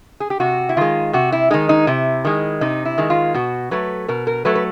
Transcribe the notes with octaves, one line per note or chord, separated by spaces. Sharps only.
G#4
G4
C3 F#4
E4
D#3 G#3 F4
C3 F#4
E4
D#3 G#3 D#4
D#4
C3 E4
D#3 G#3
C3 D#4
E4
D#3 G#3
F4
B2 F#4
F#3 A3 B4
B2 A#4
A#4
F#3 A3 B4
B4